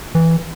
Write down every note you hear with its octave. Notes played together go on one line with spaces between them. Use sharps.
E3